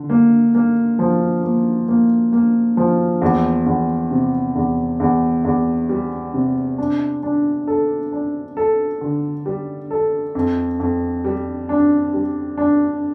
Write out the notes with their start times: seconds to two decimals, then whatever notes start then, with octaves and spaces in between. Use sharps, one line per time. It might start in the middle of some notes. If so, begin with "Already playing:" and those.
Already playing: D3
0.10 A#3
0.55 A#3
0.99 F3
1.43 A#3
1.88 A#3
2.33 A#3
2.77 F3
3.22 E2
3.66 E2
4.11 C3
4.55 E2
5.00 E2
5.45 E2
5.89 G3
6.34 C3
6.78 D4
7.23 D4
7.67 A4
8.12 D4
8.57 A4
9.01 D3
9.46 G3
9.91 A4
10.35 F2
10.80 F2
11.24 G3
11.69 D4
12.13 G3
12.58 D4